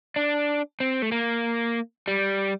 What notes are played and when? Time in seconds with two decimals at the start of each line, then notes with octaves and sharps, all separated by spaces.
0.16 D4
0.80 C4
1.02 A3
1.12 A#3
2.08 G3